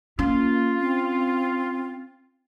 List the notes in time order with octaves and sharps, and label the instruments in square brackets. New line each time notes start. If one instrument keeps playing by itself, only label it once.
[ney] A#3 [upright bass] C#4 [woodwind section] F4
[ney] C4